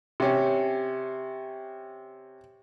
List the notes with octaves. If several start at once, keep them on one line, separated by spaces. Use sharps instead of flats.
C3 C#4